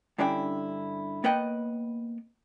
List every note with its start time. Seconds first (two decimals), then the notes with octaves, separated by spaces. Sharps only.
0.18 G2 D3 C#4 D4 E4 G5
1.24 A#3 B3 B4 C#5 D#5 G5